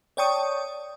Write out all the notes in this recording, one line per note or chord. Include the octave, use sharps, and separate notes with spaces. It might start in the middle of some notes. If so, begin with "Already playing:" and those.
C#5 D5 G5 A5 C#6 D#6